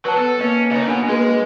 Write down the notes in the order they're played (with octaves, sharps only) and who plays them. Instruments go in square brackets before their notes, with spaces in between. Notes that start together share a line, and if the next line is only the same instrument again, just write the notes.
[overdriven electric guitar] F#3 [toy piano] B4 A5
[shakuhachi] B3 [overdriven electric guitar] A4
[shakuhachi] A#3 [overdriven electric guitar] C#4 [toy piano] D#5
[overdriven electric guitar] C#3 D#4 [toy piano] C#5 D#5
[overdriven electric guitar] B2 [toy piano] D4 G#5
[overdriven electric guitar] G#3 [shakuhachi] A#3 [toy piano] F#4 G#4 B4